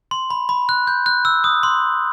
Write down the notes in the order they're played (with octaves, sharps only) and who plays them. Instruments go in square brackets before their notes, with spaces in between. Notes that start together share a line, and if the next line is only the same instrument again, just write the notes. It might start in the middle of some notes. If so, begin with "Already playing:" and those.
[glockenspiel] C6
B5
B5
F#6
G6
F#6
E6
D#6
C6